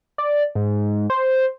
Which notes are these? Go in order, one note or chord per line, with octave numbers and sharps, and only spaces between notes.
D5
G#2
C5